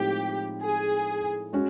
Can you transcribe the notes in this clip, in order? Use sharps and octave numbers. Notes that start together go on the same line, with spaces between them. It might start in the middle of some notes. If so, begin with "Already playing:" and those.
Already playing: A2 F3 G#3 C4 D#4 G4
G#4
G#3 C#4 F#4